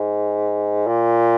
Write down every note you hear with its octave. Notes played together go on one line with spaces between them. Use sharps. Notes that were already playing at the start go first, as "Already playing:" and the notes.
Already playing: G#2
A#2